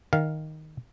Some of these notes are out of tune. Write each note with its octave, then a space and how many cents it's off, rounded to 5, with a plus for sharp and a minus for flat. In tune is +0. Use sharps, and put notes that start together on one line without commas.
D#3 +0 F5 +0